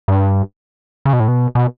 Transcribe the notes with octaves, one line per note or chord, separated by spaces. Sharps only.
G2
C#3
B2
A2
B2
B2